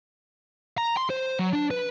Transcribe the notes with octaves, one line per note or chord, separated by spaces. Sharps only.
A#5
C6
C5
F#3
D4
B4